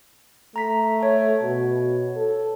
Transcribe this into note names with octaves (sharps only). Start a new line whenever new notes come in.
A3 A#5 B6
C#5
B2
A4